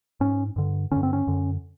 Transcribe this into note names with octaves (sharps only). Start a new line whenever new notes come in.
G#2 C#4
G2 D3
G2 D3 C#4
C4
C#4
F#2 D3